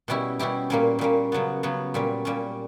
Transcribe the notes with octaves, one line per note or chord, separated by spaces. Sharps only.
B2 G3 C#4 E4 G4
B2 G3 C#4 E4 G4
A#2 G3 A#3 C#4
A#2 G3 A#3 C#4
C#3 F#3 B3
C#3 F#3 B3
A#2 G3 C#4
A#2 G3 C#4